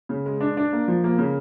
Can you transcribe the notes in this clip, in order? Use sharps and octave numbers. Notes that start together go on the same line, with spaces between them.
C#3
G#3
D4
D4
A#3
F3
A#3
C#3